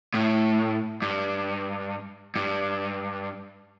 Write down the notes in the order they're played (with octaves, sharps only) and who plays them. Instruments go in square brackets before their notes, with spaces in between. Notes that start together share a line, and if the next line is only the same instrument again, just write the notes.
[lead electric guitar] A2
G2
G2